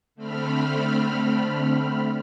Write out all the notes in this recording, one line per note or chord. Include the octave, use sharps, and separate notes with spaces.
D3 A3 C4 B5 F6